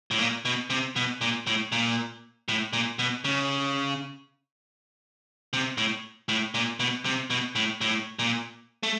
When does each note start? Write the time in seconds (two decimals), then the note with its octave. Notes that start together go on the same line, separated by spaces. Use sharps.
0.11 A2
0.19 A#2
0.45 B2
0.70 C3
0.96 B2
1.21 A#2
1.47 A2
1.72 A#2
2.48 A2
2.73 A#2
2.99 B2
3.24 C#3
5.53 C3
5.78 A2
6.28 A2
6.54 A#2
6.80 B2
7.05 C3
7.30 B2
7.55 A2
7.81 A2
8.19 A#2
8.83 A3